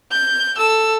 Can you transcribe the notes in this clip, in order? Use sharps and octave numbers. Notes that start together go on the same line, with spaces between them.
G6
A4 E6